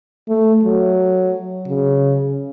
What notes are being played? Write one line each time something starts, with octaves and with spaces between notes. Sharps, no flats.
A3
F#3
C#3